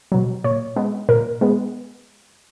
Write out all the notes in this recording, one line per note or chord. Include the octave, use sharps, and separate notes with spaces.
B2 F#3
A#2 C#5
G#3 B3
A#2 A#4
G#3 B3